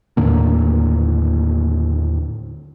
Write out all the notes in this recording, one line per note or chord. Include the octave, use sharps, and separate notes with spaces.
D#2 A2 D3 A#3